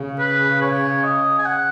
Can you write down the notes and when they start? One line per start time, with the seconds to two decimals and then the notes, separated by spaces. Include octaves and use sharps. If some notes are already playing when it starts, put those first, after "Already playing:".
Already playing: C#3
0.19 B4
0.62 C#5
1.03 D#5
1.38 G#5
1.45 F#5